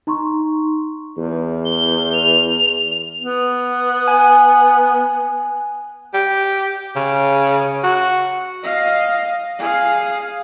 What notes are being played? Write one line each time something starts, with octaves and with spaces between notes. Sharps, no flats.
D#4 A#5 C6 C#6
E2
G7
F7
B3
G#5
G4
C#3
F#4
D#5 F5
G#4 F5